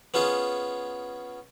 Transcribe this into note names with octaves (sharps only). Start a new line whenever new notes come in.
B3 C#4 F4 G#4